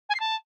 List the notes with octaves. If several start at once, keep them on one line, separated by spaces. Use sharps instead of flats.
G#5
C7
A5